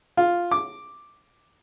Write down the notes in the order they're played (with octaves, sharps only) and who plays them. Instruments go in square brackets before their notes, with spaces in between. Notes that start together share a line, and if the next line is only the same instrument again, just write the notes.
[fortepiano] F4
D6